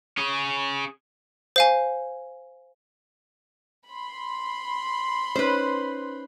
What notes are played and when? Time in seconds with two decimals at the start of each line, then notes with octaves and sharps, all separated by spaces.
0.17 C#4 G#4
1.56 C5 F5 G#5
3.88 B5 C6
5.36 C#4 D#4 B4 C5